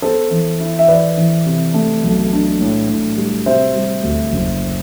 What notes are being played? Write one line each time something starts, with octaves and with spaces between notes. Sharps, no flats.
B3 A4 C5
E3
E4
E5
E3 B4 D5
E3
C3
A3
B1
D4
A2
A2
G3
C3 C5 E5
G3
D2
F#1